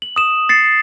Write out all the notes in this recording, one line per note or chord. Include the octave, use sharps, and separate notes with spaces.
F#7
D#6 E7
A6 C7 C#7